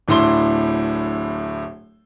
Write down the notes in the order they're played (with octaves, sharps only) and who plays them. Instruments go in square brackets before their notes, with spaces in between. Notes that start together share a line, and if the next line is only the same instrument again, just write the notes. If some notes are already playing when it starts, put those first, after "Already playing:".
[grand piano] D1 A2 D4 E4 C6 G7